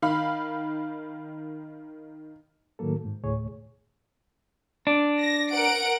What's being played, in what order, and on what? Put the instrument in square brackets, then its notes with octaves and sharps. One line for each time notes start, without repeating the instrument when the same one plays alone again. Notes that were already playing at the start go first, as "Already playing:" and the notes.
[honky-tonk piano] D#3 F5 B5
[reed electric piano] A2 D#3 F#3 A#3 A4
G#2
D2 A2 G#4 C#5
[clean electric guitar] D4
[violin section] A#6
A#4 F#5 D7